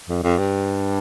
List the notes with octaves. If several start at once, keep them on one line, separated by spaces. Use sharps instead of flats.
F2
F2
G2